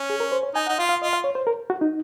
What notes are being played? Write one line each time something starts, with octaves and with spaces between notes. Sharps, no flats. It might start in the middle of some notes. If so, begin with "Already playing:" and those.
Already playing: C#4
G#4
A#4
C5
C#5
D#4 G#5
D#4 F#5
F4 F5
F5
F4 D#5
F5
C#5
C5
A#4
F#4
D#4